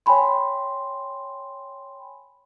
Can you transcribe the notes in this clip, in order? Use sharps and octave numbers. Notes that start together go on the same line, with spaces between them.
C#5 G5 G#5 B5 C6